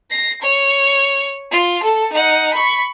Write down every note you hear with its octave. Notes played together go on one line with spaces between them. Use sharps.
A#6 C7
C#5
F4
A4
D#4 F#5
B5 C#6